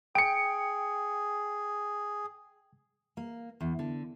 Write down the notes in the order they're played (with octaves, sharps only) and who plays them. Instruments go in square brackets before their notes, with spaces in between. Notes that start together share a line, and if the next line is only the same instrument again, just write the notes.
[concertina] G#4 [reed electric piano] G5 [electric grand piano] C#7 D7
[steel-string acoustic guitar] A#3
E2
D3